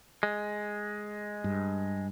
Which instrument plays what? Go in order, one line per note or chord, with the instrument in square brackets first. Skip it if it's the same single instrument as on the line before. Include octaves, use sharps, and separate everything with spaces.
[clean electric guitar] G#3
[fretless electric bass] G2